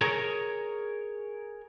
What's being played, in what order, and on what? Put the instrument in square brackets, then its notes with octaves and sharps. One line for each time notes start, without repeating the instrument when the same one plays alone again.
[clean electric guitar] G#4 A#4 C#5